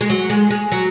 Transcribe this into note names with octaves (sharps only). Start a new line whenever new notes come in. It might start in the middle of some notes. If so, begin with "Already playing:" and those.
G#3
F#3
G#3
G#3
F#3